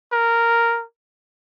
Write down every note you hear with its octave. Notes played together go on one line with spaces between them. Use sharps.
A#4